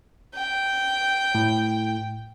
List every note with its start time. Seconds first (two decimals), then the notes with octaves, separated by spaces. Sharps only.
0.36 G5
1.35 A2